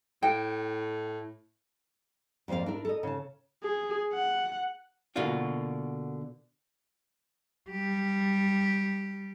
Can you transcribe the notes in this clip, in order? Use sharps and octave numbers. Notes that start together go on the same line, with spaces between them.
A2 G5
F2 A#3 C5 D5 F5
D4 E4 A#4
A4 A#4 D#5
C#3 A5
G#4
F#5
B2 D3 A#3 F4 F#4
G3 G4